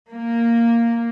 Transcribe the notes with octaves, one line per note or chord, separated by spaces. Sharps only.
A#3